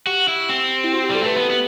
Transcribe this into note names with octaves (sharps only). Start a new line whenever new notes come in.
F#4 G4
E4
C4
E4
F#4
G4
G3 A4
A3 B4
B3 B4
B3